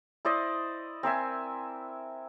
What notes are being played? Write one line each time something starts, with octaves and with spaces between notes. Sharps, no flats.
E4 C5 D5 D#5
C4 A#4 E5 G#5